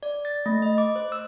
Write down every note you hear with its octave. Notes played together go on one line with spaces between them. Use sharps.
D5
A6
A3
D#5
D6
C5
E6